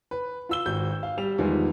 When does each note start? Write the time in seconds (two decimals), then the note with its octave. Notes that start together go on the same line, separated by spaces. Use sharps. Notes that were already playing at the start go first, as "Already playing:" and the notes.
0.11 B4
0.49 F4 E6 G7
0.66 G#1 F#4 G6
1.03 F5
1.17 G3 F7
1.38 E2 D#3 F3 G3 G#3